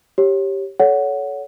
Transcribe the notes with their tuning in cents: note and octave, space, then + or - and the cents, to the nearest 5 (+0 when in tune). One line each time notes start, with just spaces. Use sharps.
G4 -5 C#5 -15
A4 -25 C#5 +25 F#5 +0